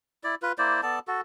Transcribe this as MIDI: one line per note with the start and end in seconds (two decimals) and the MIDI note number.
0.24 0.35 64
0.24 0.35 74
0.42 0.52 65
0.42 0.52 71
0.58 0.81 58
0.58 0.81 64
0.58 0.81 72
0.58 0.81 74
0.83 0.99 59
0.83 0.99 69
0.83 0.99 74
0.83 0.99 81
1.08 1.21 66
1.08 1.21 69